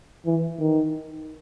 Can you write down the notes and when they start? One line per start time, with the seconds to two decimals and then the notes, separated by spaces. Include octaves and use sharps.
0.26 E3
0.60 D#3